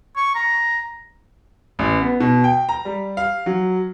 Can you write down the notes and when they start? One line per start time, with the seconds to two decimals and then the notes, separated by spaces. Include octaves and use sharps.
0.17 C#6
0.35 A#5
1.79 A1
2.01 B3
2.20 B2
2.44 G5
2.69 A#5
2.85 G3
3.17 F5
3.46 F#3